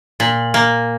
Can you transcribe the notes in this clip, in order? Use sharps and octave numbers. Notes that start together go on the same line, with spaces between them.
A#2
A#3